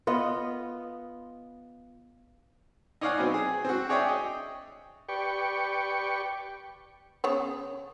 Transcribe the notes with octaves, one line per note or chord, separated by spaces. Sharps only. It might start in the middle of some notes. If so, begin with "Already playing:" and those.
B3 F4 D#5
D#4 C#5 D5 F5 F#5 G#5
B2 F#3 B3 C4
G#4
C4 F#4
G#4 C#5 D5 E5 G5
D#5
G4 B4 D5 G5 C#6
C#3 B3 C#5